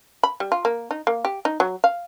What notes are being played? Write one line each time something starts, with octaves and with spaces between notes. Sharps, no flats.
B5
G3
F4
A#3
D#4
A#3
G4
D#4
F#3
F5